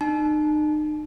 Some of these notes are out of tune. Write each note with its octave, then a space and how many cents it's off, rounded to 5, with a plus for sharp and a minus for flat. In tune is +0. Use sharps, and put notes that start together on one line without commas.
D#4 -40 A5 -40